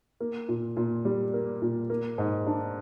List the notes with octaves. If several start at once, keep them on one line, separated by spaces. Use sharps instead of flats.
A#3
A#2
A#2
G3
A#3
A#2
A#3
G#2
D4